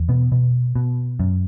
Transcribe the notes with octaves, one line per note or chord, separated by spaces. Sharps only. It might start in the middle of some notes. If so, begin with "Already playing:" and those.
Already playing: E2
B2 B3
B2
B2
F#2